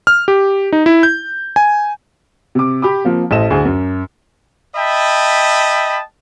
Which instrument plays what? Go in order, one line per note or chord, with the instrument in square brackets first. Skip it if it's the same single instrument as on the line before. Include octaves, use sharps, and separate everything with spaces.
[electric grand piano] F6
G4
D#4
E4
G6
G#5
[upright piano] C3 D6
G4 B5 D6
F3 A#3 C4
A1 A4 C5 D#5 E7
D2 G#4
F#2
[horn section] D#5 E5 G5 A5 B5